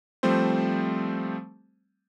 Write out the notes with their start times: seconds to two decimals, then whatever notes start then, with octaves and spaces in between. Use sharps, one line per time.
0.23 F3 G3 A3 C4 C5